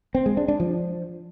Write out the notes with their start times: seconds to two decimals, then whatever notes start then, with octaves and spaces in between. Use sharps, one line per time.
0.15 C4
0.26 G#3
0.37 D4
0.48 D4
0.60 F3